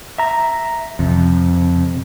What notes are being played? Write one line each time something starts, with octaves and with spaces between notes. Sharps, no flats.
E5 A#5
F2 C3